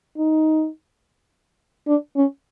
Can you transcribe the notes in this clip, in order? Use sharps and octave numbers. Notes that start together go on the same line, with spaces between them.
D#4
D4
C#4